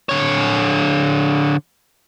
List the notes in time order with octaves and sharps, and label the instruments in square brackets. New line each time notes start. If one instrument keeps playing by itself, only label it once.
[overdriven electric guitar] D3 C#5